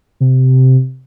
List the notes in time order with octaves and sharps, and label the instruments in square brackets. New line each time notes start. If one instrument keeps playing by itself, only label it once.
[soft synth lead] C3